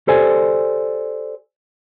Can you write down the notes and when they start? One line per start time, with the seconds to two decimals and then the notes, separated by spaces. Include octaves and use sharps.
0.08 G4 A4 C5 D5 G#5